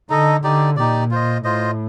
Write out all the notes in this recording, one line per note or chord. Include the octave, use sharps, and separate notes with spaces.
D3 D#4 A4 D#5
D3 D#4 G4 D5
A#2 D#4 G4 D5
F4 C5 D#5
A2 F4 C5 D#5